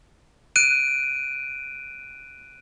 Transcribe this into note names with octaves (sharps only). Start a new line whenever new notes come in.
F#6 D7 D#7